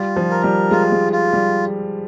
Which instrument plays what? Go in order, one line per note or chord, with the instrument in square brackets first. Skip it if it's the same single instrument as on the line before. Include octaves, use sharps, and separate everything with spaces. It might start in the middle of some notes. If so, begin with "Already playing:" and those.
Already playing: [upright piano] G3 [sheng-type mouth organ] F4
[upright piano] F3
[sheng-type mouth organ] A#4
[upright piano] G3
[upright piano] G#3 [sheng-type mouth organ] F4
[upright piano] G#3
[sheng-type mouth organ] F4
[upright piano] G3